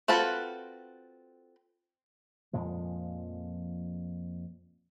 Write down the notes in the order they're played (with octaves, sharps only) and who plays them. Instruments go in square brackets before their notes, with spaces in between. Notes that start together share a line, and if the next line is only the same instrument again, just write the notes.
[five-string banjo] C4 F4 F#4 A4 B4
[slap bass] F2 A#2 F3 G#3